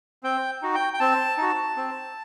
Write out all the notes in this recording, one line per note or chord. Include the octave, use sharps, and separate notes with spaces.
C4 G5
D#4 F#4
G5
G5
C4 A5
D#4 F#4
C4